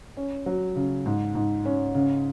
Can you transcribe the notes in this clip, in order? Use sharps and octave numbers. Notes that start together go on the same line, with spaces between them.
C#4
F#3
C#3
G#2
G#2
C#4
C#3